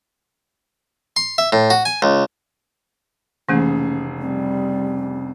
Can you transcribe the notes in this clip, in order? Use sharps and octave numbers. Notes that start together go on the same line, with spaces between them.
C6
E5
A2
F#4
G#5
C#2
F1 C#3 E3 A3 A#3 C#4 G#4
G3 C4